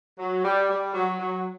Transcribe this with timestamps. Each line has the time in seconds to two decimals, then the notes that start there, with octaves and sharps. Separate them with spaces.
0.18 F#3
0.44 G3
0.69 G3
0.94 F#3
1.19 F#3